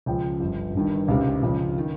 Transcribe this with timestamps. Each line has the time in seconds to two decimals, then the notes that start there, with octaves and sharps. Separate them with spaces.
0.06 C#2 C#3 F3 G5
0.40 G1 G2 F3
0.74 G1 G2 D#3
1.08 C#2 C3 D#3 F5
1.43 C#2 C#3 F3
1.78 D#3